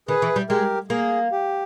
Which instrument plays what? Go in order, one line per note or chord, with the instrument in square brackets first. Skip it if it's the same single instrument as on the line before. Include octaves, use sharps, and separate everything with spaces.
[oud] D#3 [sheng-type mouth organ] G#4 B4
[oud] E3
G3
[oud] G#3 [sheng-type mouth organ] G4 A#4
[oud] A#3 [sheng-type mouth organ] G#4
[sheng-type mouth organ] G4